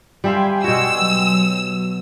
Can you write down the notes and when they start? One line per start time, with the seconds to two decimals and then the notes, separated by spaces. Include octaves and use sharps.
0.24 G3 E5 F5 G5 G#5 C6
0.64 B2 F#4 E6
1.01 F#3